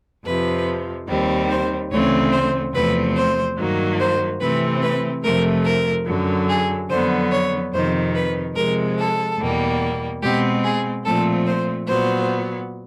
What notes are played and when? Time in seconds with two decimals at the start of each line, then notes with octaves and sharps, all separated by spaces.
0.24 F2 C3 F3 B4
1.07 D#2 D#3 G3 C4
1.49 C5
1.91 D2 C#3 E3 A3 C4 C#5
2.32 C5
2.73 E2 C3 F3 A3 C4 B4
3.15 C5
3.57 G2 D#3 F#3 A#3
3.99 C5
4.39 C3 E3 A3 C4 B4
4.82 B4
5.23 F2 C3 F3 A3 A#4
5.64 A#4
6.05 F#2 D3 F#3
6.48 G#4
6.89 F2 D3 F#3 B3 C5
7.31 C#5
7.72 F2 C3 D#3 C5
8.14 B4
8.55 C3 F3 G#3 A#4
8.96 A4
9.39 E2 B2 G3 A#3
10.22 B2 G#3 C4 G4
10.63 G#4
11.04 A#2 F3 A3 C4 A4
11.45 C5
11.87 A#2 F#3 B3 C5